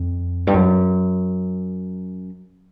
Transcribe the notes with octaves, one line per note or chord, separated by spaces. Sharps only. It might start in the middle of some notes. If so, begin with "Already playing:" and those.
Already playing: F2
G2
F#2